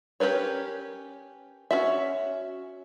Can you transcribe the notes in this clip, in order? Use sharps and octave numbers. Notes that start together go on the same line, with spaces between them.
C#4 G4 A#4 B4 C#5
C#4 F#4 E5